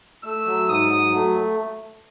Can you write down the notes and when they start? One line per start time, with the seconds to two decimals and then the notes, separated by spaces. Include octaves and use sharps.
0.24 A3 E6
0.47 F#3
0.68 G#2 D#6
0.90 F#3
1.14 A3